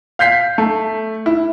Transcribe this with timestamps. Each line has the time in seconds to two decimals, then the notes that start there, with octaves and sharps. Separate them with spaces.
0.19 F5 G6 B6 C7
0.58 A3
1.26 E4